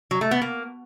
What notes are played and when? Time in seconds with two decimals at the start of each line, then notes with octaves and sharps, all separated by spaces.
0.11 F#3
0.21 A3
0.31 B3
0.41 A#3